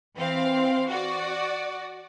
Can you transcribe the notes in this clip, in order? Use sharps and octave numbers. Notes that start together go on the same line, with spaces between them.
E3 C4 F5
F#4 D5